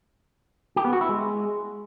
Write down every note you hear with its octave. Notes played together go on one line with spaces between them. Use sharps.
G4
B3
F#4
E4
G#3